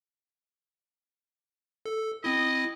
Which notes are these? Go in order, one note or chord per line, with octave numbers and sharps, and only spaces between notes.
A4
C4 E4 D#5